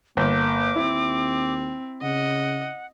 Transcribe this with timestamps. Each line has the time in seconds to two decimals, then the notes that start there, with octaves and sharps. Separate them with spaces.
0.17 G1 A#3 D6
0.76 D#2 C4 E4
2.02 C#3 D#5 F#5